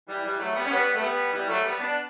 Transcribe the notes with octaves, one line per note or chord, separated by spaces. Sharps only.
E3 G3
E3 G3
F#3 A3
G3 B3
C#4
G3 B3
A3
G3 B3
E3 G3
F#3 A3
G3 B3
B3 D4